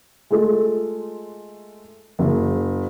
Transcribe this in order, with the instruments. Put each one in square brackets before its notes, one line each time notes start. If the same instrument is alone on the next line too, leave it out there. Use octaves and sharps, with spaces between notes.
[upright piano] G#3 A3 F4 A4
F#1